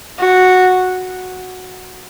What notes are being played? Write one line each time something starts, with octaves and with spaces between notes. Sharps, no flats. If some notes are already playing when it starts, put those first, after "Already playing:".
F#4